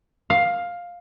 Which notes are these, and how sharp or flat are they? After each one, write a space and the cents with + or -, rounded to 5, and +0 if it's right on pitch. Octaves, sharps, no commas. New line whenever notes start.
F5 +10